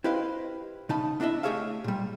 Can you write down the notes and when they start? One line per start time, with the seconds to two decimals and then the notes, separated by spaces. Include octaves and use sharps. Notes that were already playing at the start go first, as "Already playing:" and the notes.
0.04 E4 G4 B4 C5 D#5 F5
0.89 C#3 D#4 A5 B5
1.20 B3 D4 E4 D#5 E5
1.43 A3 G4 G#4 C#5 E5 F5
1.84 A#2 G3